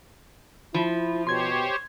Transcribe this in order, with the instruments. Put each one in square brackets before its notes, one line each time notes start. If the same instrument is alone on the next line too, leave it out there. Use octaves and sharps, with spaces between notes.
[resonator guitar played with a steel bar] F3 [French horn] E4 [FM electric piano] B5
[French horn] B2 [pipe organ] G4 C5 C#5 [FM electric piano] C6 G#6